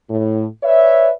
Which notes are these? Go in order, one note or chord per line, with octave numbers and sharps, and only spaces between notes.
A2
B4 C#5 D5 E5